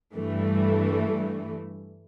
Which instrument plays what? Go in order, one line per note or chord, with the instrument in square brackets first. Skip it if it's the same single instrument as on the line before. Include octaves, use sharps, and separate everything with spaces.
[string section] G2 E3 A3